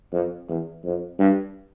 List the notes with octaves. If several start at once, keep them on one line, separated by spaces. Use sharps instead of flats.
F2
E2
F2
G2